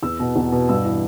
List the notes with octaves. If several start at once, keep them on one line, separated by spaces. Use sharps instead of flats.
E2 E6
B2
E2
B2
G2 E6
E3